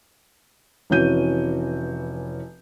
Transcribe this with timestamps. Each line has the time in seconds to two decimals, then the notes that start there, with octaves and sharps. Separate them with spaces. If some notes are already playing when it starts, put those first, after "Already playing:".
0.90 F1 E3 C#4 F#4 G6 D#7